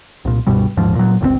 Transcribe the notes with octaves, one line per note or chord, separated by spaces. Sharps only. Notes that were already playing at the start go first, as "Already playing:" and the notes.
C2 A#2
C#2 G2 B2 G3
D#1 D#2 G#2 F3
A#2 F#3
G1 C#2 D3 C4